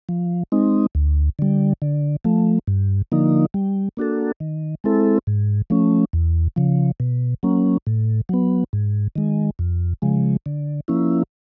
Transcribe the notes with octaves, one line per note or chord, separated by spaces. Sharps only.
F3
G#3 C4 D#4
D2
D3 G3
D3
F3 A3
G2
D3 F3 A#3 D#4
G3
A#3 D4 F#4 A4
D#3
G#3 C4 E4 A4
G#2
F3 A3 C#4
E2
C#3 F3
B2
F#3 A#3 C#4
A2
F#3 B3
G#2
D#3 G#3
F2
C#3 F3 G#3
D3
F3 A#3 C#4 E4